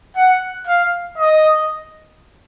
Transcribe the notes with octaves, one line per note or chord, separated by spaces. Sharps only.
F#5
F5
D#5